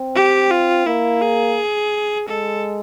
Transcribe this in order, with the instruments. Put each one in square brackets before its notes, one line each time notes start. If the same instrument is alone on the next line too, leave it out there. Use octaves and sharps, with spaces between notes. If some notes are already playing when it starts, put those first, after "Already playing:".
Already playing: [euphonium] C4
[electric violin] G4
F4
[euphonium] A#3 [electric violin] E4
[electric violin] G#4
[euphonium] G#3 [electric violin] A4